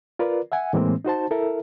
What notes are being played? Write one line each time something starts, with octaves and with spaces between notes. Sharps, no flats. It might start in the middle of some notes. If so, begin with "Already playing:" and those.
F4 A#4 B4 D5
E5 F#5 G#5
A2 E3 G#3 A#3 C4
D#4 F#4 C5 A5
E4 A4 A#4 E5